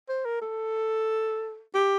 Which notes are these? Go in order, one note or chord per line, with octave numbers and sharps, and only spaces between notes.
C5
A#4
A4
G4